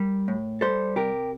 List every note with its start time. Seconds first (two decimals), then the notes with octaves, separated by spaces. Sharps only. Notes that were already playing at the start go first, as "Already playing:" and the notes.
Already playing: G3 A#4
0.28 A2
0.61 G3 A4 C5
0.96 C3 G4 A#4